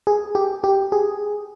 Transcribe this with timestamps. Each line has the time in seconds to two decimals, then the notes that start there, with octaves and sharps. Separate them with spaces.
0.07 G#4
0.35 G4
0.64 G4
0.92 G#4